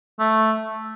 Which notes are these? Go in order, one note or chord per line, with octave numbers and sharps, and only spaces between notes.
A3